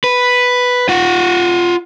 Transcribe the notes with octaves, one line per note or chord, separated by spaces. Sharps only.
B4
F4 F#5